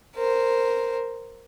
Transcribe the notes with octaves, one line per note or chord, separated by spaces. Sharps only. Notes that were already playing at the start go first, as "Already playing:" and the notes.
A#4 C5